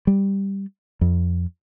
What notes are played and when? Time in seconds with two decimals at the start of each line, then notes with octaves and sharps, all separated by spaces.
0.07 G3
1.01 F2